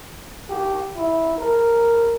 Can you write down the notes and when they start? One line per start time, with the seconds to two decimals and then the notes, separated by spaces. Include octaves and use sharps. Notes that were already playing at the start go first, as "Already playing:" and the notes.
0.49 G4
0.95 E4
1.38 A#4